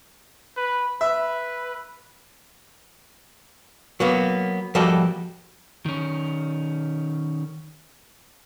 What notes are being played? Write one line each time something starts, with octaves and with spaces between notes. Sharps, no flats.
B4
B4 E5
F#3 A#3 B3
F3 G3 A#3 F#4 A4 D#5
D#3 C#4